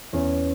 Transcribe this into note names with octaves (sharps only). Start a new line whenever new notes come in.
E2 C#4